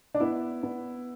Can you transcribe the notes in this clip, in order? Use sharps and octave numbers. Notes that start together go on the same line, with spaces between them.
D4
B3 E4
B3